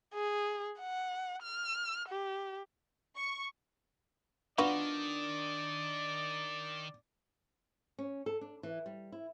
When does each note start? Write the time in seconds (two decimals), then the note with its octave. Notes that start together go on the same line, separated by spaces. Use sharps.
0.14 G#4
0.80 F#5
1.42 F6
2.09 G4
3.16 C#6
4.58 D#3 B3 D4 F4 F#4 D5
7.99 C#4
8.26 A4
8.41 D4
8.63 E3
8.86 G3
9.12 E4